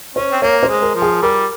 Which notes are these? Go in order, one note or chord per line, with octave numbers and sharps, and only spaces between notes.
C#4 C5
C4
A#3 C#5
C5
G#3
A#4
F3
G#4
G3 A#4